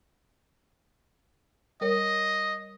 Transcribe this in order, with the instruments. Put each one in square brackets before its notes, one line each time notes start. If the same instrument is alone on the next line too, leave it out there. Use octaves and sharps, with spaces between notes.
[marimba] G3 A#4 C#5 [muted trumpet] D#5